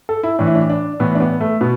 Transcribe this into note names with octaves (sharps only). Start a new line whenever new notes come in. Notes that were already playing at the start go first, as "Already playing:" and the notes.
A4
E4
A2 E3 D4
E4
D4
D4
A2 E3 B3
D4
B3
A3
B2 B3